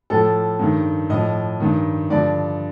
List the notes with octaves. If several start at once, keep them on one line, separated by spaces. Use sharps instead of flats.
A2 F3 A4
G2 D#3
A2 F3 D#5
G2 D#3
G2 D3 F3 D5